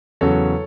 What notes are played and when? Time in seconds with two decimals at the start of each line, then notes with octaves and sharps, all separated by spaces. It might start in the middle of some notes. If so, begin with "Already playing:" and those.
0.21 E2 C#3 F#3 A4 C#5